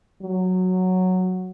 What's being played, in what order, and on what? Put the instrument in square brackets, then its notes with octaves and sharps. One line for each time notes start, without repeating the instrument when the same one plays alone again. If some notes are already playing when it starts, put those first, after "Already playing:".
[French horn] F#3